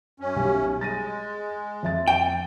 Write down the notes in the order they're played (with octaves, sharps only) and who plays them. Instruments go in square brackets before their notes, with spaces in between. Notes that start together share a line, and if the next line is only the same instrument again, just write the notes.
[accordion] F#2 C#4
[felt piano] B1 G3 G#5
[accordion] G#3 [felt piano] A6 A#6 D#7
[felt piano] F2 E5 A6
[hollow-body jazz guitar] G5